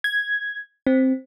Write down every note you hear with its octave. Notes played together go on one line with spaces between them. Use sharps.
G#6
C4